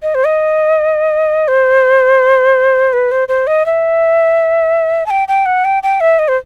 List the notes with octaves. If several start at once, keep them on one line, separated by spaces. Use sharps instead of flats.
D#5
C5
D#5
C5
B4
C5
C5
D#5
E5
A5
G5
G5
F#5
G5
G5
E5
D#5
C5